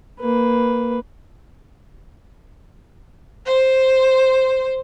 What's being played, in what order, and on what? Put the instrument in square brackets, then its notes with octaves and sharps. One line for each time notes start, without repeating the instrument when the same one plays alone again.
[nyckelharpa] A#3 B4
[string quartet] C5